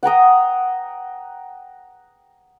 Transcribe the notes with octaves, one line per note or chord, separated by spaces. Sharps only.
F#5 G5 A#5 D#6